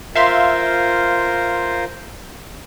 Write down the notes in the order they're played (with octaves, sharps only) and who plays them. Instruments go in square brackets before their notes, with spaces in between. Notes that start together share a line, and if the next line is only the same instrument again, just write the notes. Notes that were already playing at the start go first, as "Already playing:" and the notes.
[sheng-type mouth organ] F4 A#4 C5 [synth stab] E5 F5 C6